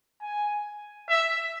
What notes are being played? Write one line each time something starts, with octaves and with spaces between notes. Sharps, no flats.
G#5
E5